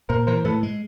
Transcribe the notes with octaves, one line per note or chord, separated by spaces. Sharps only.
A#2 A#4 C5
E3 A#4 C5
A2 A4 B4
G#3